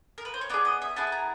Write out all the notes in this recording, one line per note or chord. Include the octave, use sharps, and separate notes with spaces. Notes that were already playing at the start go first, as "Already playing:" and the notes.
A#4
B4
C5
C#5
B3 E4 G#4 D5
D#5
E5
B3 E4 G#4 A5
A5
A#5